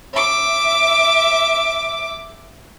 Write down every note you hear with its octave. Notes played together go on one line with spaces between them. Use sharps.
E5 D6